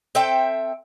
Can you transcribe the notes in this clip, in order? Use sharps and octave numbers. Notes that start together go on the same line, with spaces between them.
C4 A4 E5 G5